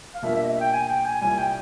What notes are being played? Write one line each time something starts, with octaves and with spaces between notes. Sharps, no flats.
F5
B2 G3 A#3 D4 F4 E5
E5
D#5
E5
G5
G#5
G5
G#5
C2 A#2 G3 G#5
G5